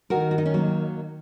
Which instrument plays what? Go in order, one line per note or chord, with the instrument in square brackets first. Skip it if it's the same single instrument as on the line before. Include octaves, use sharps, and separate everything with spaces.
[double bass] D#3 [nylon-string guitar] F#4 A#4
[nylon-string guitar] F#4
D#4
C#4
F#3 A#3